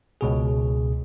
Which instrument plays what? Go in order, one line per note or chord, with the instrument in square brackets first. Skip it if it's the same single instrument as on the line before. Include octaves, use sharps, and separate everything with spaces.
[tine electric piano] C#2 B2 G#4